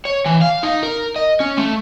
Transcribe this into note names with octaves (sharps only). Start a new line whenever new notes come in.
C#5
E3
F5
D#4
A#4
D#5
C#4
A3